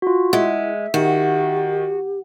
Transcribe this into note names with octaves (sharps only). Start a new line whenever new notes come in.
F4 F#4
G#3 E4 E5 F#5
D#3 F#4 G4